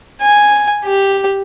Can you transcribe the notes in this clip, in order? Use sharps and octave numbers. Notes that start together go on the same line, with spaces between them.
G#5
G4